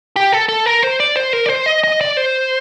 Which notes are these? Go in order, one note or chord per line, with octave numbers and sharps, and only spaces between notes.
G4
A4
A4
A#4
C5
D5
C5
A#4
D5
C5
D#5
D#5
D5
C5